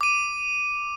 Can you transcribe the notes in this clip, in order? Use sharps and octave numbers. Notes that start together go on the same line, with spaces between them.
D6 D#7